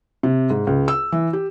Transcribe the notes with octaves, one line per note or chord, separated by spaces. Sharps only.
C3
G#2
C#2
E6
E3
G4